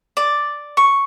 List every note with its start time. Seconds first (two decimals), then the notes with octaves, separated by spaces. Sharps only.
0.17 D5
0.77 C#6